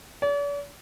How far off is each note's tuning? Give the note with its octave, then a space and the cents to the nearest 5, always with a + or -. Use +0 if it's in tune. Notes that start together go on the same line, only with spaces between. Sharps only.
D5 -45